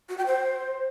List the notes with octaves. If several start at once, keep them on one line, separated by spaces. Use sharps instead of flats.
F#4
G5
C5